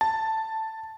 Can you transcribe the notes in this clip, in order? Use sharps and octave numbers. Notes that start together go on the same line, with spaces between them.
A5